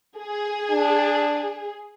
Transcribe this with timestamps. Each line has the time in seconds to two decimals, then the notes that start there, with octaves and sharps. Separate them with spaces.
0.17 G#4
0.71 D4